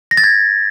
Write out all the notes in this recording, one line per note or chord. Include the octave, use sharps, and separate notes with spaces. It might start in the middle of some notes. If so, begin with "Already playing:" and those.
A#6
A6
G#6